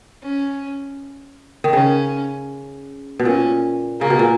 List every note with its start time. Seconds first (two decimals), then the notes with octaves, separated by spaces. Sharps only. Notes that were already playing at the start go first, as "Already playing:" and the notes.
0.23 C#4
1.64 D#3
1.73 C#3 C#4
3.19 B2
3.25 A#2 C#4
4.00 C#3 A#3
4.10 B2
4.19 A#2